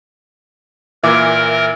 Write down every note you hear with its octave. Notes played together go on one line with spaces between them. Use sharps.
A#2 E3 A#4 E5 D6